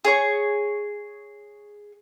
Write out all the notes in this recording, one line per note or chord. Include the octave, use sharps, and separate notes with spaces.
G#4 C#5 C#6